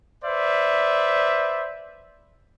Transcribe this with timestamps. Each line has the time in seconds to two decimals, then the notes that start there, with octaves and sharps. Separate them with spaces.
0.25 B4 C5 D5 E5